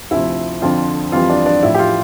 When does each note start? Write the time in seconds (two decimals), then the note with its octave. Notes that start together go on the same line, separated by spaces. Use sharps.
0.11 D2 C3 F3 E4
0.62 F2 D3 F3 F4
1.12 F2 E3 G3 F4
1.30 D4
1.46 D4
1.63 A2 F3 E4
1.74 G4
1.79 F4